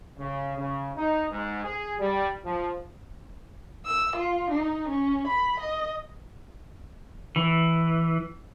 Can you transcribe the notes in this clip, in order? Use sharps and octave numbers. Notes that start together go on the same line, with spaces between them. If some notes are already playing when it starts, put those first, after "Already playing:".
C#3
C#3
D#4
G#2
G#4
G3
F3
E6
F4
D#4
C#4
B5
D#5
E3